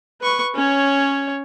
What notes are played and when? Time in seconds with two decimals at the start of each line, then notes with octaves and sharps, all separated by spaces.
0.22 B4 C#6
0.55 C#4 C#5